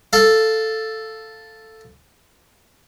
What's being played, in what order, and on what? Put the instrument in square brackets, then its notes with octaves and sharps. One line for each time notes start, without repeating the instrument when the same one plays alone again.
[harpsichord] A4 F5